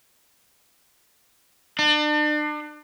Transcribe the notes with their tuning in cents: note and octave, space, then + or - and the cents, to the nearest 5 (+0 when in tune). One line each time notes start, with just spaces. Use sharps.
D4 +35